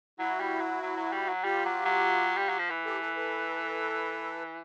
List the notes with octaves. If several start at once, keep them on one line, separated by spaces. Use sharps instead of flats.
F#3 E4 F#4
G3
F#3
F#3
F#3
G3
F#3
G3 F4 G4
F#3
F#3
G3
F#3
F3
E3
G4 A4
A4 B4
A4 B4